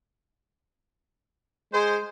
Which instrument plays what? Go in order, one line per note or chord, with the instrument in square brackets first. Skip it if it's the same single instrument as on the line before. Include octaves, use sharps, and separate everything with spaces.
[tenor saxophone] G#3 [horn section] C5